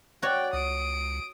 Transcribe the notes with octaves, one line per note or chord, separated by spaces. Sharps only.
F#4 C#5 D5 G5
C#2 D#6 D7